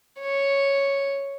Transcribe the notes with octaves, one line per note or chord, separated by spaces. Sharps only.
C#5